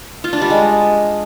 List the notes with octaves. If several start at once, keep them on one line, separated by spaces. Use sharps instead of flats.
F4
D4
G3
G#3